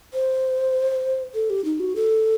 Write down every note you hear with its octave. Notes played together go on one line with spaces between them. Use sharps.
C5
A4
G4
D#4
F#4
A4